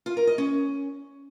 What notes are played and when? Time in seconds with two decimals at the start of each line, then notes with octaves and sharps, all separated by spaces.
0.06 F4
0.17 A#4
0.27 D#5
0.38 C#4